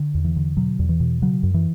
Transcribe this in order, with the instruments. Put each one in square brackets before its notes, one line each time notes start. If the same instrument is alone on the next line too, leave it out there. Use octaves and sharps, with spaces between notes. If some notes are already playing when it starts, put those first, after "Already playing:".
Already playing: [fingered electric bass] D3
E2
E3
D3
B2 F#3
E2
E3
B2
C#3 F#3
F#2
E3